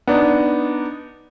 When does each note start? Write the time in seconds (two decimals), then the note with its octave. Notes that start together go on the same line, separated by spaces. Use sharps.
0.08 B3 D4 D#4